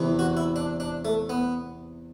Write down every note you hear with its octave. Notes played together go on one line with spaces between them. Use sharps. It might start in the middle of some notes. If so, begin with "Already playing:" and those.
Already playing: E2 C3 E3
F#4
E4
D4
D4
A3
B3